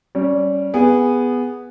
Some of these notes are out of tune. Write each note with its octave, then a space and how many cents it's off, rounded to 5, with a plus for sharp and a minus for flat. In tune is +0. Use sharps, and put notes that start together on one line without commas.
G3 -20 C#4 +0
B3 +0 G#4 -15